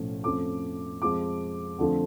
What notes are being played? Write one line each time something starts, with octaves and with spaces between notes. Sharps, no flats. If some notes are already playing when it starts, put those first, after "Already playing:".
Already playing: B1 A2 F3 A3 C#4
F2 F3 A3 C#4 D6
F2 F3 G#3 D6
F2 D3 F3 A3